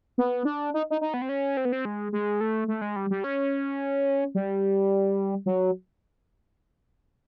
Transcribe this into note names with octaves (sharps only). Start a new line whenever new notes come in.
B3
D4
D#4
D#4
D#4
B3
C4
C#4
C4
B3
C4
G#3
G#3
A3
A3
G#3
G3
G3
C#4
G3
F#3